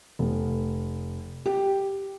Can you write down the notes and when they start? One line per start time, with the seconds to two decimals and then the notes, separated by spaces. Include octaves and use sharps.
0.19 F1
1.46 G4